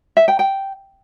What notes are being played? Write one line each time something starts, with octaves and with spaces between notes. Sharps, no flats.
E5
G5
G5